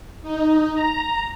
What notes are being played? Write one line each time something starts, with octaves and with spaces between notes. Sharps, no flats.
D#4
A#5